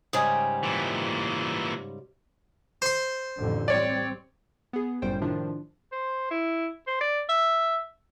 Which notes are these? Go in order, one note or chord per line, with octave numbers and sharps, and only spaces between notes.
G#2 C#3 G3 G4 G#5 D#6
A#2 E3
C5 C6
A1 F2 D3
G3 C4 C#5 D5
B3 G#4
G1 F#2 A2 G3 C5 G5
A2 C3 D#3 F3 D4 F4
C5
E4
C5
D5
E5